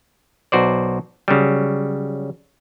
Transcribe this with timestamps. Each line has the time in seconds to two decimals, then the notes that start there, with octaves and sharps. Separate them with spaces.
0.52 B1 F#4 C5 D5
1.28 C#3 F#3 G3